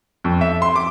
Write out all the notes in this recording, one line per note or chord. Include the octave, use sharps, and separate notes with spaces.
F2
E5
C6
D6